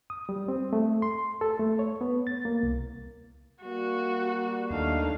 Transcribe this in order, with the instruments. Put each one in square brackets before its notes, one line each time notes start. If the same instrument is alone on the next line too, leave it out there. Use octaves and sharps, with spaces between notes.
[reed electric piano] D#6
G3
C4
A3
C6
A4
A3
C#5
B3
A6
A#3
C2
[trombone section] G3 A#3 [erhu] F#4
[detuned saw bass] D#2 [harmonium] A3 D4 D#4 [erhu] F5